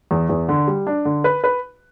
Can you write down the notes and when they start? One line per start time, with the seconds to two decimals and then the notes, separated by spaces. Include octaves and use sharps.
0.11 E2
0.29 E2
0.49 D3
0.67 G3
0.87 D4
1.05 D3
1.24 B4
1.44 B4